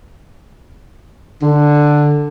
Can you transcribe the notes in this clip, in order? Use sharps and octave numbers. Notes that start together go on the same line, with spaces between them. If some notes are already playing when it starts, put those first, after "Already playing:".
D3